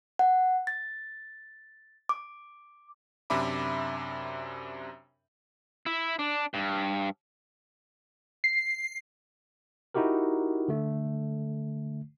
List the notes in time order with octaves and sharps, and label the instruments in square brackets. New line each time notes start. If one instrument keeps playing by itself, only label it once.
[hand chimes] F#5
A6
D6
[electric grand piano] F#2 C3 D4 E5 B5 D6
[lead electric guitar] E4
D4
G2
[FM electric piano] C7
[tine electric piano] D#4 E4 F#4 G4 A#4
D3 A3